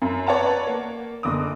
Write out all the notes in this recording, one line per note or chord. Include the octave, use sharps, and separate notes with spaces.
F#2
B4 C#5 D5 F#5 A5 A#5
A#3
F#1 D3 D6 D#6